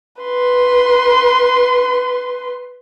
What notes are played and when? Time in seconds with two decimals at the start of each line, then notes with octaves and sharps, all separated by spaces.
0.22 B4 C6